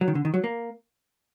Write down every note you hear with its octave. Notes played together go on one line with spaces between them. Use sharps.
F#3
D#3
D3
D#3
F#3
A#3